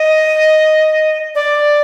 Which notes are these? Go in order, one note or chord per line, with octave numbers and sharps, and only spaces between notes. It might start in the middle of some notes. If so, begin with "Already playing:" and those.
Already playing: D#5
D5